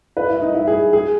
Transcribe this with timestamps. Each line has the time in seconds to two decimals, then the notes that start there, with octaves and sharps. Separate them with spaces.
0.17 B4
0.30 E4
0.42 D#4
0.55 E4
0.67 G#4
0.93 G#4